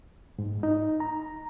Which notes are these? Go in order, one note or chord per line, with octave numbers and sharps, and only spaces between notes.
G#2
D#4
A#5